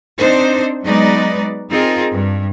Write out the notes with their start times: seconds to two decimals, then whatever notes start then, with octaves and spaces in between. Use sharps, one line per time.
0.19 C4 D4 D#4 C5
0.83 F#3 G#3 B3 D#4 B4 D5
1.71 C4 D#4 F4 G#4 A#4
2.11 G2